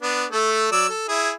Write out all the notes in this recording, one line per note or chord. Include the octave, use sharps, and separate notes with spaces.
B3 D4
A3 A4
F#3 D5 E6
A4
E4 G#4